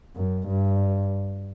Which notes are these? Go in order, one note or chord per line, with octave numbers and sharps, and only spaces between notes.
F#2
G2